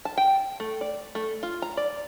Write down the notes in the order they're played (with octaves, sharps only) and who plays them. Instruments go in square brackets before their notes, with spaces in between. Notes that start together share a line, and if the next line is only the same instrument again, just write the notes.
[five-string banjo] A5
G5
A3
D5
A3
F4
A#5
D5